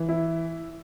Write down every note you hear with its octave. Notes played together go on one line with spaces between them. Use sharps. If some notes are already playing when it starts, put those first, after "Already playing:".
Already playing: E3
E4